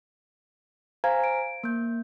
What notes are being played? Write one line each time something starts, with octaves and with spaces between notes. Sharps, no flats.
C5 F5 G#5 A#5 G#6
D7
A#3 G6